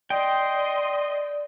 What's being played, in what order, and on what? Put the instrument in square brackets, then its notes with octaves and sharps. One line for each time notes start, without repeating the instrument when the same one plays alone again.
[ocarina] D5 [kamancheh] D#5 C6 [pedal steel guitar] G5